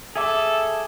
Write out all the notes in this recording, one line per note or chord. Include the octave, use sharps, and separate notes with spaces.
G#4 A4 E5 D6